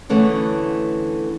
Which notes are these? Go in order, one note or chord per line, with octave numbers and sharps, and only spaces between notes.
D3 E3 A3 B3 C#4